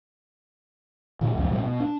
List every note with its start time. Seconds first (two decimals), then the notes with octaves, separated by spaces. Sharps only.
1.21 A#2 D3 D#3
1.35 C#2 F#2 F3
1.49 A1 B2 G3
1.64 B2
1.80 D4